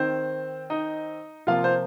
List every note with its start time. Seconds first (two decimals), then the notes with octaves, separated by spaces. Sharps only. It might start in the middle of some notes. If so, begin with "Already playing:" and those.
Already playing: D#3 C4 C5
0.70 D#4 D#5
1.47 C3 F3 A#3 F4 F5
1.64 C5